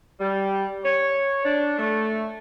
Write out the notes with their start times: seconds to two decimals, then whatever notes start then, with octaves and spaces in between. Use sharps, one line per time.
0.20 G3
0.84 C#5
1.45 D4
1.78 A3